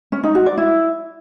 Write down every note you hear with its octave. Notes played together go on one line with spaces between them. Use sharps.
C#4
D#4
F#4
D5
E4